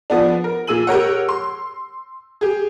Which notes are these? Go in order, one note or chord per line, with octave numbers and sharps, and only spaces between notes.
F3 B3 D4
A#4
A#2 G#4 E6 D#7 F#7
G4 A#4 C#5 F#5
C6
G4 G#4